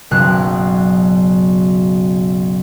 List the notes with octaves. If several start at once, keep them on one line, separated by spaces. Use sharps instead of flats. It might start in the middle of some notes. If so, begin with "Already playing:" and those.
F#1 B1 F#6